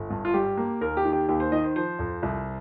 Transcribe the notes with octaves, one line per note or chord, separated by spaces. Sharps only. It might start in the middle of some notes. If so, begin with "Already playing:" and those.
Already playing: G1
G2
F4
G3 G4
A#3
D#2 A#4
G4
D#3
G4
D#2 G4
C5
D#3 D#5
C5
F3 C5
F2
C2